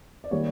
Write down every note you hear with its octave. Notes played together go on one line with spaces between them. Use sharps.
D5
D#3 G3 A#3 C#5